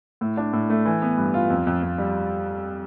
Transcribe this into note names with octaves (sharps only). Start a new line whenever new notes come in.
A2
D4
A2
A3
E3
B3
G2
F4
F2
F2
F2
G3